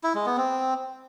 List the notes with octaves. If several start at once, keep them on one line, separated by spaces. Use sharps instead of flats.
E4
G#3
B3
C4